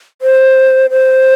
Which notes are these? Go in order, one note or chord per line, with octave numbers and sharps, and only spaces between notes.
C5
C5